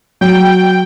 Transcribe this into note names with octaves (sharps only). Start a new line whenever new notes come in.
F#3 G5